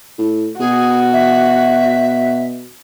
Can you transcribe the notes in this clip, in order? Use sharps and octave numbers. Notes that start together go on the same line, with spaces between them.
A2
B2 F#4 G#4
E5